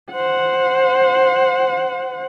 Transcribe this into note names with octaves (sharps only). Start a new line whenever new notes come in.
C5 F#5